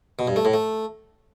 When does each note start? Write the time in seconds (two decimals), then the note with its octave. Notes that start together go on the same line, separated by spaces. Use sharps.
0.19 B2
0.27 G2
0.36 A3
0.45 A2
0.54 A3